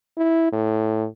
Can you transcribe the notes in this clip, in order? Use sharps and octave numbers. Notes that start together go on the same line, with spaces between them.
E4
A2